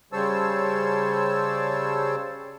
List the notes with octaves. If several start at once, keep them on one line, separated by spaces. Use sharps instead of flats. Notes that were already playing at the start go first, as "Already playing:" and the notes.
C#3 G3 C5 C#5 A5 E6